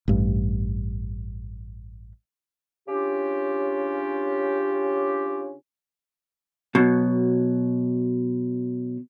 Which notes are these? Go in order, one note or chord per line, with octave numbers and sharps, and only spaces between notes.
A1 G2
C#3 C#4 D4 F4 G4
B2 F#3